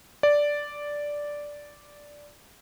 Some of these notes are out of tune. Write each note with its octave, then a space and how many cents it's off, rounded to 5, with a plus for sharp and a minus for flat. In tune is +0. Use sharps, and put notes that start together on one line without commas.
D5 -5